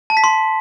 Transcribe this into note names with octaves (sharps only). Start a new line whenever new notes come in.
A5
B6
C6